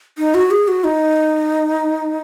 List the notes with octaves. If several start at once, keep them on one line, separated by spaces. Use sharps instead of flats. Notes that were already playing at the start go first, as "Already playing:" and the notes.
D#4
F#4
G#4
F#4
D#4